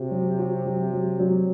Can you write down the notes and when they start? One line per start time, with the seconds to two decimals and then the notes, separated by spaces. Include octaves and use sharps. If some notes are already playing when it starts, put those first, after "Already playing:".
Already playing: C3 F#4
0.11 F#3
0.39 F#4
0.65 F#3
0.92 F#3
1.20 F#3